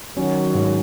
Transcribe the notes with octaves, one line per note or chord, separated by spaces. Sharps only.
D#3 F#3 C#4
G#2